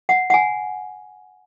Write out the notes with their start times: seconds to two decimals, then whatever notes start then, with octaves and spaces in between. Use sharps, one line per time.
0.09 F#5
0.30 F#5
0.34 G#5